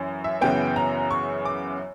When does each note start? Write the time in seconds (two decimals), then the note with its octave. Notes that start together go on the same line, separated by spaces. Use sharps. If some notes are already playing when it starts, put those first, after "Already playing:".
Already playing: F#2 E3
0.24 E5
0.41 F#2 C#3 E3 B3 G5
0.76 A#5
1.11 C#6
1.45 D6